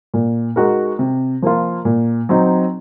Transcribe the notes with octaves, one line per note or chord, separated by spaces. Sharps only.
A#2
G#3 D#4 F#4 A#4
C3
F3 A#3 F4
A#2
F#3 C4 D#4